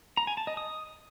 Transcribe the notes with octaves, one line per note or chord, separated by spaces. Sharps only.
A#5
G#5
A5
D#5
D#6